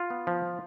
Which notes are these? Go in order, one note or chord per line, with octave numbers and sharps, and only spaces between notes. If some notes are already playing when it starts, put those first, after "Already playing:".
Already playing: F4
B3
F3